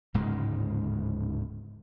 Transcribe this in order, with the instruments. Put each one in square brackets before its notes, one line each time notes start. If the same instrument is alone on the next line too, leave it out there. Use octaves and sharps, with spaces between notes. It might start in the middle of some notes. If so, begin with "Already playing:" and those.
[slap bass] D1 G#2 C#3 G#3